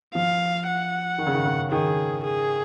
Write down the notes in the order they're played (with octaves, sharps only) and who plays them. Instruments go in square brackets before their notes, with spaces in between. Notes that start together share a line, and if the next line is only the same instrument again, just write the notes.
[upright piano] F3 [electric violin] F5
[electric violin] F#5
[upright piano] D#3
C#3
D#3
C#3
[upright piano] D#3 [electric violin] G#4
[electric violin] G#4